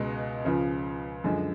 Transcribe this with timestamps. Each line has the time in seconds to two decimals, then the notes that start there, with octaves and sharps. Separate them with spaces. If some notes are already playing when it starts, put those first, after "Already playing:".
Already playing: C#2 B2 G#3
0.45 C#2 C#3 F3
1.24 F#2 D3 F3 G#3